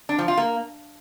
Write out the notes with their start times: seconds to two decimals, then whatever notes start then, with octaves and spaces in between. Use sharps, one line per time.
0.09 D4
0.19 F3
0.28 F4
0.37 A#3